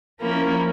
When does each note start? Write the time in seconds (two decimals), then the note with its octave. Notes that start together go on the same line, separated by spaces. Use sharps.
0.20 F3 A#3 C#4 E4